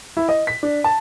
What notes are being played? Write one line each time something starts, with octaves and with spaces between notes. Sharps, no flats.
E4
D#5
B6
D4
A5